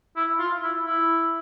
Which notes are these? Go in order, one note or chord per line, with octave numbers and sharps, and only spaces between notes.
E4
F4
E4
E4